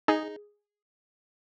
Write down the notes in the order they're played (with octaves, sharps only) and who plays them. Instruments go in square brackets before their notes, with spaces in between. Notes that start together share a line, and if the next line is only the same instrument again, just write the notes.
[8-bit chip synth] D#4 [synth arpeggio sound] G#4